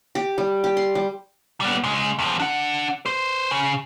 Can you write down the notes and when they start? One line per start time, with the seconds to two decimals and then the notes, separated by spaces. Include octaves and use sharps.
0.15 G4
0.38 G3
0.64 G4
0.77 C6
0.95 G3
1.61 G3 B3
1.84 C#3 G#3
2.19 E2 F3
2.40 D4 F#5
3.06 B4 C5
3.51 C#3